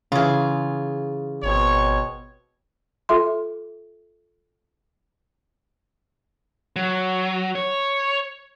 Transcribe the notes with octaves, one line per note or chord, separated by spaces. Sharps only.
C#3 E3 F4 G#4
G#1 B2 C4 C#5
F4 A4 E5 C6
F#3
C#5